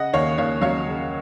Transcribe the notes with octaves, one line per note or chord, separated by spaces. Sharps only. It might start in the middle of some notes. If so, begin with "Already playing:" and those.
Already playing: C#3 D#5 F#5
D#2 C#5 F5
D#2 C#5 F5
F#3 C#5 F5
C#3